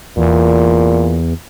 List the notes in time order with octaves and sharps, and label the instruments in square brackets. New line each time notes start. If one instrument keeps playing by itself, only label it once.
[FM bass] E2 [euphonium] A#2